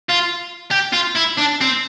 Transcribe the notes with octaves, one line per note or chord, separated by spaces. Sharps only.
F4
G4
F4
E4
D4
C4